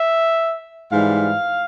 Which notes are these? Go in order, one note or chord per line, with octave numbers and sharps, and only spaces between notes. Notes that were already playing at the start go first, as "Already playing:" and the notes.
Already playing: E5
G#2 E3 G3 F5